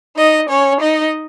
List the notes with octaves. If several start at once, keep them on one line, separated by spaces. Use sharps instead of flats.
D#4 D#5
C#4 C#5
D#4 D#5